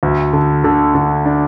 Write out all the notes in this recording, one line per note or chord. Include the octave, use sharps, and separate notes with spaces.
D2
D3
D3
D3
D4